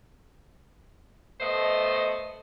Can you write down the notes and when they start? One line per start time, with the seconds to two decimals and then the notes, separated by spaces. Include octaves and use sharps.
1.41 A3 B3 C5 D#5